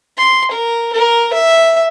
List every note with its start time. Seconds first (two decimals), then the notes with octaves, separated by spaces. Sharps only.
0.17 C6
0.51 A#4
0.93 A#4
1.33 E5